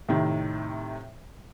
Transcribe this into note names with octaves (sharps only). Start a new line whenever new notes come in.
A2 C3 D#3